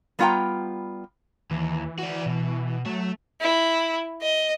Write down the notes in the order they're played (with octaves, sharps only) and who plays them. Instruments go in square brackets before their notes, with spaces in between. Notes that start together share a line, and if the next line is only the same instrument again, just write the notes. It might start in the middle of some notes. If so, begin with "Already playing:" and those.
[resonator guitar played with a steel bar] G3 B3 F4 F#5 G5 A#5
[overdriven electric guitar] D#2 [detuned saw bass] E3
[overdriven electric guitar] F#4 D5
B2
[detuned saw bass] F#3 [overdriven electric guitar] A3
[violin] E4
D#5